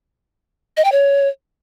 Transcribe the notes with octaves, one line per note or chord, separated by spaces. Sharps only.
D#5
G5
C#5